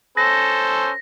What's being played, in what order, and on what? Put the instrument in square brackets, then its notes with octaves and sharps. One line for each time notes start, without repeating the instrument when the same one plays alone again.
[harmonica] C#4 A4 C5 [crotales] A#6